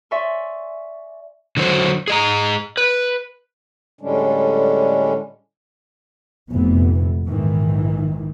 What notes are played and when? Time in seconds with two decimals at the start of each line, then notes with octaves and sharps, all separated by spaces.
0.11 D5 E5 G#5 C6 C#6
1.57 D3 F#3 F#4 C5
2.08 G#4 D#5 A#5
2.77 B4
4.01 A2 D3 G3 G#3 C#4 D4
6.52 F1 A#2 E3 B3
7.26 A#1 G#2 D#3 E3